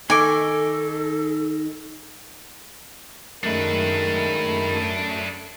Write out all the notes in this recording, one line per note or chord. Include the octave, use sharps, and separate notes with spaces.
D#3 D#4 A4 G#5 C#6 D6
F#2 D#3 G#3 A3 D4 A#4 B4